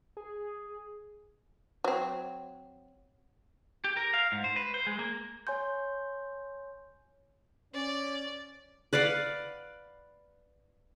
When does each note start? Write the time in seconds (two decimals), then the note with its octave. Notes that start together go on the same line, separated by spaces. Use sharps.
0.17 G#4
1.84 F#3 C4
3.84 G4
3.97 A#4
4.14 F5
4.32 G#2
4.44 C5
4.56 B4
4.74 C5
4.87 G#3
4.99 A#3
5.47 C#5 G#5 C6 G6
7.74 C#4 D5
8.93 B4 D5 F5 F#5